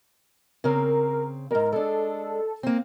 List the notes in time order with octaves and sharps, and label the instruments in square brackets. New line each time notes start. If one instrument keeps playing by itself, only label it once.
[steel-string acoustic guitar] C#3 C4 [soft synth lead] A#4
[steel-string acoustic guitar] F2 G#2 [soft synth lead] A#4
[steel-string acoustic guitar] G#3 D4 [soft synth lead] A4
[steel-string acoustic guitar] A#3 C4